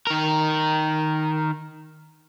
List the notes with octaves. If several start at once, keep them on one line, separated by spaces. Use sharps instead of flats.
D#3 A#4